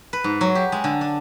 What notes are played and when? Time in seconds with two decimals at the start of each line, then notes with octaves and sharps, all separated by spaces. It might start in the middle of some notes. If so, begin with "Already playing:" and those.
0.13 B4
0.24 G#2
0.41 F#3
0.55 G4
0.72 G#3
0.84 D3
1.01 D4